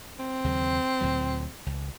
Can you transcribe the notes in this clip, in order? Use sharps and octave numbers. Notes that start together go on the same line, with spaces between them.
C4
D#2 C#3 F#3
D2 A#2 F#3
C#2